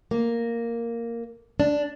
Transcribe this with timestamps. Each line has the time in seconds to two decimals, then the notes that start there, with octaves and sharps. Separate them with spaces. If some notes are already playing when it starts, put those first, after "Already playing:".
0.11 A#3
1.60 D4